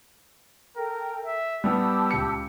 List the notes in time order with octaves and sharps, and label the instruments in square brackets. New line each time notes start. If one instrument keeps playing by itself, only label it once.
[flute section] A4 G5 [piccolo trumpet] A#4
[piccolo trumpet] E5
[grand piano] G3 B3 E4 [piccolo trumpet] G4 [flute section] A5 D6 E6
[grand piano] C#2 C#7